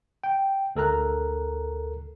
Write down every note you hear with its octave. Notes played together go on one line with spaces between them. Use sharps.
G5
D2 A4 A#4 A#5 F#6